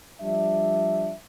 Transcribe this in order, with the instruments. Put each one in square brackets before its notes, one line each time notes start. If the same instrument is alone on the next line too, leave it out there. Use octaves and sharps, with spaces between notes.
[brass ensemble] F3 G3 D4 E5